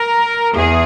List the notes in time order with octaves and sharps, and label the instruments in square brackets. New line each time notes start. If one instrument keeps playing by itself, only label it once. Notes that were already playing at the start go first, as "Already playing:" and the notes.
Already playing: [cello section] A#4
E2 G#4